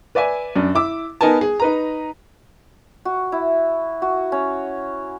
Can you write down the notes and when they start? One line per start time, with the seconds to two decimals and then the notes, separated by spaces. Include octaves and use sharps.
0.15 B4 D5 E5 G#5
0.56 F#2 D4
0.75 E4 D6 E6
1.21 B3 D#4 A#4 B4 G#5 A5
1.41 G#4
1.60 D#4 B4 A#5
3.05 F#4
3.32 E4
4.02 F#4
4.32 C#4